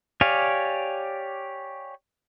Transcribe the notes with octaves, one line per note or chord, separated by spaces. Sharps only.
G4 C#5 D5 F5 G#5